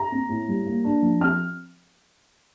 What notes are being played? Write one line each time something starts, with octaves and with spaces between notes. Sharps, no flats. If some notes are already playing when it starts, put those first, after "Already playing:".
Already playing: A#5
C4
A2
G3
A#3
D4
F3
C4 F6